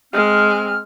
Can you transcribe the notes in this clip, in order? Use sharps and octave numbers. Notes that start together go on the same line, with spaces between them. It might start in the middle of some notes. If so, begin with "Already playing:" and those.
G#3 C4 F6